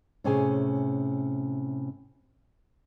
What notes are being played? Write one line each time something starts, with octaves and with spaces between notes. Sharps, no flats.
A2 C3 C#4 G#4 G#5